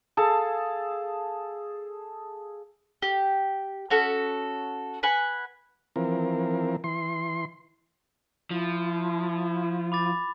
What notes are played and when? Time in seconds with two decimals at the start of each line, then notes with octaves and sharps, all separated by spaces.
0.17 G#4 A4 F5 A5
3.02 G4
3.91 C#4 F#4 A4
5.03 B4 F#5 G#5
5.96 E3 F3 C4 A#4
6.84 E3 C6
8.50 F3 E4
9.92 B5 D6 A6